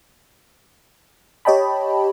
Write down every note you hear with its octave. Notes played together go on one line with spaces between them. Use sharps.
G4 C#5 D#5 G5 A5 B5